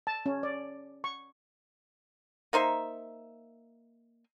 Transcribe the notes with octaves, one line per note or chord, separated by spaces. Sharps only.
A5
C#4
D5
C#6
A#3 D#4 C5 E5